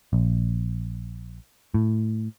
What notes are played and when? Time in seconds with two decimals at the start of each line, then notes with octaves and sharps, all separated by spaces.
0.13 A#1
1.74 A2